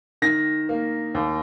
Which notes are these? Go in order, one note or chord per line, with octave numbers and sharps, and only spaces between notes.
D#3 A#6
A#3
D#2